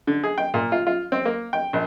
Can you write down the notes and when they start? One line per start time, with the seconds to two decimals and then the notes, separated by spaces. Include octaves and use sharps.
0.07 D3
0.24 G#4
0.38 G5
0.54 A#2
0.72 F4
0.87 F4
1.12 C4
1.25 A#3
1.53 G5
1.73 A#1